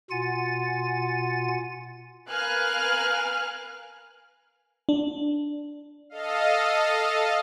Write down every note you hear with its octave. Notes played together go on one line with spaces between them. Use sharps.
B2 F4 F#5 G#5 A6
A#4 B4 F5 G#5 F6 F#6
D4
A4 D#5 F5